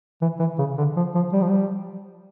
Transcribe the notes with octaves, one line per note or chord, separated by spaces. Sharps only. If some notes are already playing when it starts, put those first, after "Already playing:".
E3
E3
C#3
D3
F3
F3
G3
F3
G3